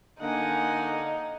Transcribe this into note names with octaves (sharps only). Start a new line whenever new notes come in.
D3 A#3 D#4 F#5 G#5